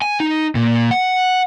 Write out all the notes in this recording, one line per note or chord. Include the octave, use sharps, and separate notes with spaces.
G#5
D#4
A#2
F#5